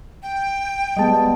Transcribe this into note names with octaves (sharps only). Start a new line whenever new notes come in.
G5
G3 G#3 B3 D#5 A5